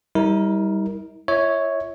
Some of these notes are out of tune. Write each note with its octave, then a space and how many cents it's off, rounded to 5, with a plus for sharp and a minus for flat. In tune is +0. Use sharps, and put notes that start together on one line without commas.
G3 +0 E4 -45 A#4 +0
E4 +45 C#5 +0 E5 -30